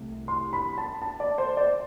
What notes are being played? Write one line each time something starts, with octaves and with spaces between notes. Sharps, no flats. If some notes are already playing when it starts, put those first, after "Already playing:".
Already playing: C2 C3 A3
C6
B5
A5
A5
D5
C5
D5